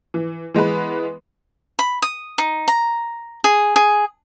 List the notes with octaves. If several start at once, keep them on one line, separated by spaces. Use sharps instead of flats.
E3
E3 G#3 B3 B4
B5
D#6
D#4
A#5
G#4
G#4